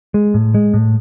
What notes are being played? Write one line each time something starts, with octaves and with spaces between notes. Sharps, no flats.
G#3
A2
G#3
A2